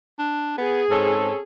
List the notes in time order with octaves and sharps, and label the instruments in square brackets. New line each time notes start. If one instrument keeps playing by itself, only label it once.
[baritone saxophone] D4
[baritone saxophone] B3 [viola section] G#4
[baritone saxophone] G#2 [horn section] C4 C#4 A4